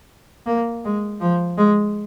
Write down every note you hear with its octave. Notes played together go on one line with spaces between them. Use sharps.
A#3
G#3
F3
G#3